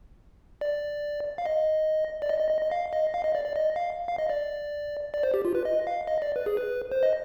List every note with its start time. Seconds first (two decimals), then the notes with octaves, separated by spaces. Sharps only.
0.61 D5
1.38 F5
1.46 D#5
2.22 D5
2.29 D#5
2.40 D#5
2.51 D#5
2.62 D#5
2.71 F5
2.93 D#5
3.14 F5
3.24 D#5
3.35 D5
3.45 D5
3.56 D#5
3.76 F5
4.08 F5
4.18 D#5
4.29 D5
5.14 D5
5.23 C5
5.34 G4
5.45 F4
5.55 B4
5.65 D#5
5.87 F5
6.08 D#5
6.22 D5
6.36 B4
6.46 G#4
6.57 B4
6.92 C5
7.03 D#5